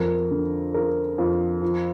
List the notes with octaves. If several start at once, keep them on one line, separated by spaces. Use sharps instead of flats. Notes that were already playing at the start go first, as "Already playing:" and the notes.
Already playing: F2 A#4
D3
F3 A#4
F2
F3